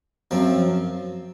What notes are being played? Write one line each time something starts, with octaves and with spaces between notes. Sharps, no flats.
F#2 F3 C4